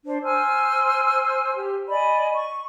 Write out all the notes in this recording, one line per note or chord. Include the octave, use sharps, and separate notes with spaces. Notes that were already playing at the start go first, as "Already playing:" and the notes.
D4 C5
C5 G#5 E6 F6
G4
D5 D#5 G#5 B5
C#6